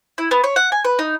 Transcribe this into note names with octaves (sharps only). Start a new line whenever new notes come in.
E4
B3
C#5
F#5
G#5
B4
D#4